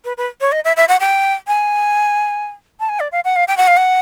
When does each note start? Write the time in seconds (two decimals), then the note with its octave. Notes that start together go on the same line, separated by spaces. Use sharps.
0.05 B4
0.17 B4
0.41 C#5
0.52 D#5
0.65 E5
0.76 E5
0.88 F#5
1.00 G5
1.47 G#5
2.80 A5
2.89 G#5
3.00 D5
3.12 F5
3.25 F#5
3.36 F5
3.48 G5
3.57 F#5
3.67 F5
3.77 F#5